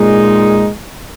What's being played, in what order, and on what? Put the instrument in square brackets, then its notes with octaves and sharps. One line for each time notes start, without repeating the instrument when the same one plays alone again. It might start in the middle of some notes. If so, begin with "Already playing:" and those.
Already playing: [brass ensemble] A#2 G#3 D#4